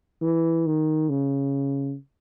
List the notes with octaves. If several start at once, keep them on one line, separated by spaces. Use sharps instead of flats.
E3
D#3
C#3